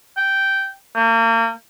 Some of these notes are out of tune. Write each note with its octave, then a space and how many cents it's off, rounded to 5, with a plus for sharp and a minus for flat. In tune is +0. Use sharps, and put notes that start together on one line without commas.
G5 -10
A#3 -35